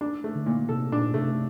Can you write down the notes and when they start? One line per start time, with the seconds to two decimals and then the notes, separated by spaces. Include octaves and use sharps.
0.01 D4
0.24 A3
0.35 D3
0.46 A#2
0.69 C3 A4
0.92 A#2 D4
1.14 C3 A3